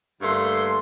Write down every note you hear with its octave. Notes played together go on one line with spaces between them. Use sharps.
G2 D3 A3 A#3 C6